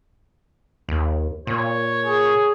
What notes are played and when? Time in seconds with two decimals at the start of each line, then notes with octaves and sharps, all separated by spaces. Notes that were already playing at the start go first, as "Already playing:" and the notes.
0.89 D#2
1.47 A#2 C#5
2.06 G#4